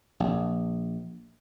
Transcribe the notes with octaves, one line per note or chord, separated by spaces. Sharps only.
A#1